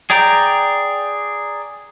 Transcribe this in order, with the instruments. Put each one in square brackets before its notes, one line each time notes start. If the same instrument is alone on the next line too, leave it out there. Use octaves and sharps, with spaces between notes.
[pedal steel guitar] G#4 D5 G5 A#5